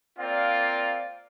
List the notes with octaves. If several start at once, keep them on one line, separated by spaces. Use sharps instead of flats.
A#3 C4 F4 D5 F5